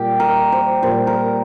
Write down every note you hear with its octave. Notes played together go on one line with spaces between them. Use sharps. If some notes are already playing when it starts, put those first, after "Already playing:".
Already playing: A#2 G3 G4
A#4
C5
A#2 G3 C5
A#4